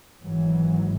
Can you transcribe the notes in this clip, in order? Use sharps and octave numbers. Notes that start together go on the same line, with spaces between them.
G#1 G#2 E3 F#3